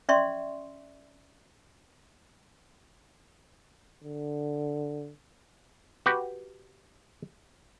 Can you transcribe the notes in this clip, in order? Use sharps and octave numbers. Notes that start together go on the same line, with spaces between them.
C#4 D5 E5 C6 C#6
D3
F#4 G4 B4